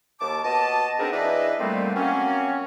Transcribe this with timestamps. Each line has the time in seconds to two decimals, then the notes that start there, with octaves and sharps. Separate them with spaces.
0.20 D#2 A5 D6
0.45 B2 D#5 A5
0.99 B3 C4 D4 D#4 G#4 A#4
1.11 E3 D4 G#4 B4 D#5
1.60 A#2 D3 G3 A3 A#3 C4
1.95 F#3 A#3 C4 C#4